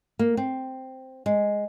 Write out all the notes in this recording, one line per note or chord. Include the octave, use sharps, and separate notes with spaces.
A#3
C4
G#3